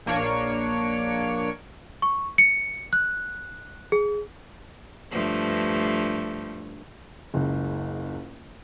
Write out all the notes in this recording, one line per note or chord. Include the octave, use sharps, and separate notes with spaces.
A#1 A#3 D4 C#5 C#7 D7
C#6
C#7
F#6
G#4
G2 F3 A3
F#1 C#2